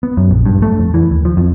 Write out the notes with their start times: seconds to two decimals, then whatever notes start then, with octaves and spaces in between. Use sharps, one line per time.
0.03 B3
0.17 F#2
0.31 A#1
0.46 G2
0.62 A3
0.79 F2
0.94 E3
1.11 D#2
1.25 F3
1.37 F2